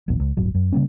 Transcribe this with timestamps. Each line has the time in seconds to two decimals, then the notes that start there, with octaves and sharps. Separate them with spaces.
0.08 D#1 A#1 E2
0.20 C#2
0.37 D1 G1 F#3
0.55 F#2
0.72 C#3 G3 A#3 C#4